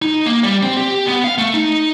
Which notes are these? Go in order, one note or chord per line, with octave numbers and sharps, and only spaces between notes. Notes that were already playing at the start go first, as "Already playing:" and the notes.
D#4
A#3
G3
C4
G4
B3
F5
A3
D#4